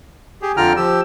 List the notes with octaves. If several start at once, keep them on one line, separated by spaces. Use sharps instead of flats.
G4 G#4
F2 D3 F4 G5 A#5 F6
F3 G4 E6